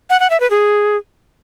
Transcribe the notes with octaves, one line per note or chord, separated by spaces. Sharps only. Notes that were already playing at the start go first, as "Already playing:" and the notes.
F#5
F#5
E5
B4
G#4